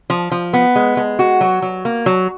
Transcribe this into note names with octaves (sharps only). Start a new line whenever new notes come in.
F3
F3
B3
G#3
G#3
F#4
F#3
F#3
A#3
F#3